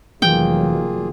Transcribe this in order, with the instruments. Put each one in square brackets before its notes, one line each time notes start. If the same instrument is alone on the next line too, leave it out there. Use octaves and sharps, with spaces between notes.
[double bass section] F1 D#3 F#3 [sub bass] E3 [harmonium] A#3 F4 G#4 [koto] G5